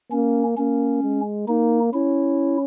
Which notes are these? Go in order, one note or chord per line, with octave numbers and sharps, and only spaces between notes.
A#3 C#4
A#3 C#4
G#3
A#3 D#4
C#4 E4